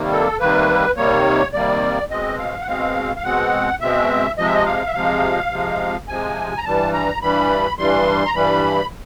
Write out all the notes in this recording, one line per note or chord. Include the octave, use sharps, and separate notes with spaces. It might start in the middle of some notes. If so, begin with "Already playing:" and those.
Already playing: C3 D#3 G3 A#3
A4
C3 D#3 G3 A#3 B4
C3 D#3 G3 A#3 C#5
C3 D#3 G3 A#3 D5
B2 G#3 C4 D#5
F5
F#5
B2 G#3 C4 F5
F5
B2 G#3 C4 F#5
B2 G#3 C4 E5
C3 F3 G#3 D#5
E5
D#5
F5
E5
C3 F3 G#3 F5
C3 F3 G#3
C3 F3 G#3 G#5
A#5
G2 E3 G3 A5
A#5
G2 E3 G3 B5
G2 E3 G3 C6
A#5
G2 E3 G3 B5